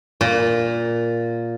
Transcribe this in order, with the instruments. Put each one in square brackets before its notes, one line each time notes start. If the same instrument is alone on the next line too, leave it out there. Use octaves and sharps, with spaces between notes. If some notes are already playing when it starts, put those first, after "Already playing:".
[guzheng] A#2